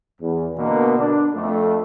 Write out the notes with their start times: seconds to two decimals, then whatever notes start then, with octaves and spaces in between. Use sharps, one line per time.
0.21 E2
0.57 B2 D3 A#3 B3
0.98 D4
1.35 F2 A3